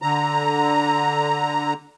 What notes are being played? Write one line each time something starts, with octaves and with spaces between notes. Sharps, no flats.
D3 A#5